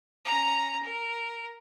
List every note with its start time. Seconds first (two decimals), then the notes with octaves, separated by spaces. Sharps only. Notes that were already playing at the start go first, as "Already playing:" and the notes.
0.25 C#4 A#5
0.82 A#4